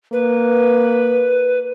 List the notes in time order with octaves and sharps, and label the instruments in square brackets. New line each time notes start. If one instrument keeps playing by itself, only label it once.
[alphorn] A#3 [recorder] B4